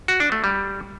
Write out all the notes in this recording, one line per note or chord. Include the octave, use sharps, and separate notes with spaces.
F#4
D4
A3
G3